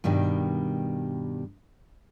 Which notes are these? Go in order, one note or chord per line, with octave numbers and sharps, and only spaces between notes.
G2 B2 D#3 G3